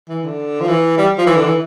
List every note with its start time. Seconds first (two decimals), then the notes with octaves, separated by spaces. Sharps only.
0.09 E3
0.24 D3
0.60 F3
0.68 E3
0.98 G3
1.18 F3
1.26 E3
1.36 D3
1.44 E3